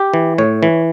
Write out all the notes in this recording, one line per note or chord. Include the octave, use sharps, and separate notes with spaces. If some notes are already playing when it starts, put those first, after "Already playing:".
Already playing: G4
E3
A2 C#5
E3